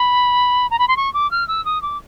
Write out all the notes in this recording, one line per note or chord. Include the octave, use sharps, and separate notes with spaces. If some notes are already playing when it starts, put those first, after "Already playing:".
Already playing: B5
A#5
B5
C6
C#6
D6
F6
E6
D#6
D6